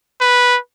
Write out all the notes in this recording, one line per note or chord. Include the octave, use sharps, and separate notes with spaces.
B4